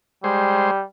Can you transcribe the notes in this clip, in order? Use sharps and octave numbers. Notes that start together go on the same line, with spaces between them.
G3 G#3 C5